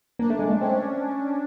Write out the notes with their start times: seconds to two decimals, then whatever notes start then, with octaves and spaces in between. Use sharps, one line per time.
0.19 A#3 D4
0.30 A3
0.39 G#3
0.50 A3
0.61 C4 C#4